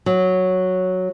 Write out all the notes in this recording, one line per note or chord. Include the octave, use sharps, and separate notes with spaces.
F#3